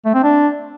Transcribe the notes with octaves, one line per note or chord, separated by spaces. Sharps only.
A3
C4
D4